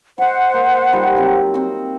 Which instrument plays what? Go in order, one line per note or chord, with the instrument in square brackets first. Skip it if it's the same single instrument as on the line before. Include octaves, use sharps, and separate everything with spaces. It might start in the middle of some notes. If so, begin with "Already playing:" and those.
[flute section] C5 F#5 [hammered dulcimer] D#5 C#6
[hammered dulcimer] A#3
G3 D#4 F4
F#3 C4
C4 F#4